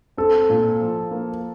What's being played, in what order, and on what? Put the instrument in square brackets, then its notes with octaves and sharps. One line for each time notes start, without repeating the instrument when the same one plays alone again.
[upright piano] C4 [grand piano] A4
[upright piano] A#2
F3
A#3